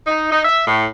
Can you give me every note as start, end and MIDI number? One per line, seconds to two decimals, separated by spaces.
0.07 0.27 63
0.31 0.42 63
0.45 0.68 76
0.68 0.86 45